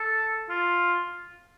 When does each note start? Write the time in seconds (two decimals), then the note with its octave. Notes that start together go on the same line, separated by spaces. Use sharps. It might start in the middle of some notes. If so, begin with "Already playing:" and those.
Already playing: A4
0.49 F4